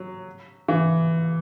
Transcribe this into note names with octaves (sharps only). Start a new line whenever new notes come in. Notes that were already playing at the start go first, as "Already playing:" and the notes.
Already playing: F#3
E3